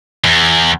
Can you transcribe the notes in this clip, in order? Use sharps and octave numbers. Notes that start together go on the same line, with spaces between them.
E2